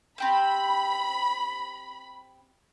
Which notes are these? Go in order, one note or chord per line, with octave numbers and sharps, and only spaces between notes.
C4 G4 C5 B5